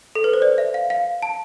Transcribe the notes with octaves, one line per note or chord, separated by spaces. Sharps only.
A4
B4
C5
D5
E5
F5
F5
A5